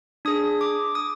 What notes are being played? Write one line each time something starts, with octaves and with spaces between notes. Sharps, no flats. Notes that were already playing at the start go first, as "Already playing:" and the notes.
D4 G#4 D#6
D6
D#6